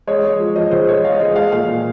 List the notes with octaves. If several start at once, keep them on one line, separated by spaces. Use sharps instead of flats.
G#3 C#5
G#3
F3
F3 D#5
C#3 C5
G#3 C#5
G#3 F5
D#5
G#3
D#5
G#3 F5
A#2 F5
A#2